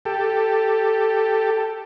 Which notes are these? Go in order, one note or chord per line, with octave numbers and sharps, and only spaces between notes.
G4 A4